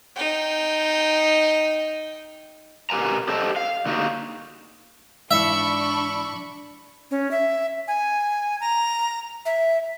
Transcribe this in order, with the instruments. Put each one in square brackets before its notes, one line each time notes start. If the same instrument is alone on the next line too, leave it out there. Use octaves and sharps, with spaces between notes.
[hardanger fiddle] D#4 G5
[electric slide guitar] B2 G4 A#4 G#5 A#5
G4 A4 C5 D#5 G5 A5
F5
D3 A#3 D#4 F#4 G4
[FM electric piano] G#2 E3 [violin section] D4 B5 C#6 [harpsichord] E5
[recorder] C#4
E5
G#5
A#5
E5